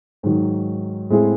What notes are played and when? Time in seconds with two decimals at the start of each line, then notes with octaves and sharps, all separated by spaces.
0.23 G#2 D#3 F#3
1.10 A2 G#3 C4 E4 G#4